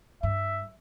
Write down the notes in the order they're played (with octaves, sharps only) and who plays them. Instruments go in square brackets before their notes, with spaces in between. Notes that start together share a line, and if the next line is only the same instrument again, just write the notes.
[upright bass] G2 [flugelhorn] E5